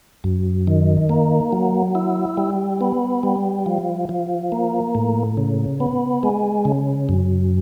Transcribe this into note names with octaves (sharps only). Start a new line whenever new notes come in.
F#2
D#3
A#3
F#3
E4
G3
B3
G3
F3
F3
A#3
A2
C#3
B3
G#3
C#3
F#2